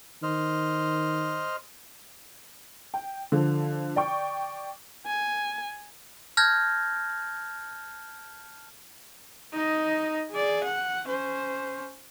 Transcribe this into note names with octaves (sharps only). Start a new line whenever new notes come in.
D#3 C5 D#5 F6
G5
D3 F3
D5 G5 C#6
G#5
A5 F6 G6 G#6 A#6
D#4 D#5
G#4 D5
F#5
C#4 C5